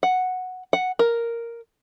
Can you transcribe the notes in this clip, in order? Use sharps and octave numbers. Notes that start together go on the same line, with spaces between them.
F#5
F#5
A#4